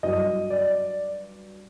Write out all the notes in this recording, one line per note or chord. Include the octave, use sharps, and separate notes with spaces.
G2 F#3 D#5
D5